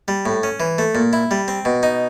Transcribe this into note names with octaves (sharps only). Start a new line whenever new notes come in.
G3
A2
C#4
E3
A3
A#2
E4
G3
C4
B2
D#4